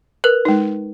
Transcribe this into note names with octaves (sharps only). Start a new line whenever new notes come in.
A#4 B4 F#6
G#3 D#4